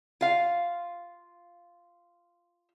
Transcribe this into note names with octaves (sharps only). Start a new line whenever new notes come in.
F4 F5